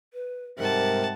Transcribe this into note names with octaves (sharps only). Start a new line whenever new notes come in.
B4
G#2 C3 G3 A#4 F#5 A5